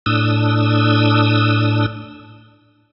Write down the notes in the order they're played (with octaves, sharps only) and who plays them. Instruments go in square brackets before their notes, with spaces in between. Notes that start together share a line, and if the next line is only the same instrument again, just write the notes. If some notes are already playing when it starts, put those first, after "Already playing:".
[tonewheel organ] A2 D4 D#6 E6